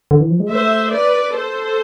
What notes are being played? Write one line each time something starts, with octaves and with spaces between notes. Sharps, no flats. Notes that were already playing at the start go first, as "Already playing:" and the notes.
D3
E3
F3
G#3
A3 C5 E5
B4 D5
A4 C5